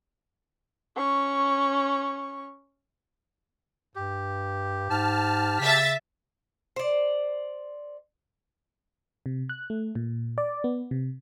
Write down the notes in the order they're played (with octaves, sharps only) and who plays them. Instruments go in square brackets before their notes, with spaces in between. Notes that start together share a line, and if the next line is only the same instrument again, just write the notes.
[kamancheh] C#4 C#6
[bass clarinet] G2 [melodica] G4
[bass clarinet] G#2 [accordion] A5 F6
[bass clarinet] C#3 [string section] E5 A6 B6
[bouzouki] C5 D5
[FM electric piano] C3
F#6
A3
A#2
D5
B3
C3